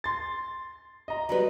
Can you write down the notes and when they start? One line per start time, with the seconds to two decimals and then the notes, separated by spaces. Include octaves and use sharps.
0.04 C6 A6
1.08 D#5 A#5
1.29 F#3 G3 B4